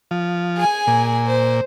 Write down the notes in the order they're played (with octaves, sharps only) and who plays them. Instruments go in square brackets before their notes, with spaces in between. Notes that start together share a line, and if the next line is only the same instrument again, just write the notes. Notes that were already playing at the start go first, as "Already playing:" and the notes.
[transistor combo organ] F3
[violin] G#4 G#5
[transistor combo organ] A#2
[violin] C5